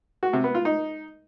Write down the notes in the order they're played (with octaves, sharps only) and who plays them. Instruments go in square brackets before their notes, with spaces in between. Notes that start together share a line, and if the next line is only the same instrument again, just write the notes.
[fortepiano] F#4
C3
B3
F4
D#4